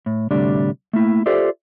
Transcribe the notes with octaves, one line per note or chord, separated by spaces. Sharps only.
A2
D2 A2 C3 G3 D4
A3 A#3 E4
F4 G4 A4 C5 D5 E5